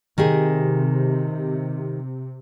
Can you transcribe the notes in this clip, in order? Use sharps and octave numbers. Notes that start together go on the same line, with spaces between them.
C3 D#3 G4 G#4